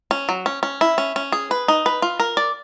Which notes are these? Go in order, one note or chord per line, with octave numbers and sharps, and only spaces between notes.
C#4
F#3
C#4
C#4
E4
C#4
C#4
G#4
B4
D#4
B4
F4
A#4
D5